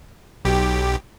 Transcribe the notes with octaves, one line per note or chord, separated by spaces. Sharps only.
B1 G4